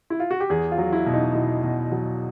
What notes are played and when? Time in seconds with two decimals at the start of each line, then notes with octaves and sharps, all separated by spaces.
0.10 E4
0.20 F4
0.31 F#4
0.40 G4
0.50 E2 G#4
0.71 F4
0.78 F#3
0.93 E4
1.06 B2
1.14 D#4
1.35 B2 E4
1.63 B2
1.92 F#3